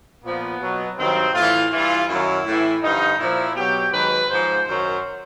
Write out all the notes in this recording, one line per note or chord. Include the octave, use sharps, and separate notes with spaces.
A#2 F3 B3
B2 F#3
G2 D#3 F#3 C4
A2 E3 F4
G2 E3 F4
F#2 D#3 F#3 E4
A2
E3
G2 D3 F3 D#4
A#2 F3 E4
B2 F#3 G4
G#2 D#3 F#3 B4
G#2 F3 C5
F#2 D#3 F#3 C5